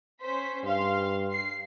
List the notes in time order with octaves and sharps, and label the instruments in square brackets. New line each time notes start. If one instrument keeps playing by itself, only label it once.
[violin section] C#4 C5 B6
[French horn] G2 [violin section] F5 C6
[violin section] C7